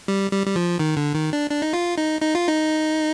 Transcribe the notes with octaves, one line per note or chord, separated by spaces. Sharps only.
G3
G3
G3
F3
D#3
D3
D#3
D4
D4
D#4
F4
D#4
D#4
F4
D#4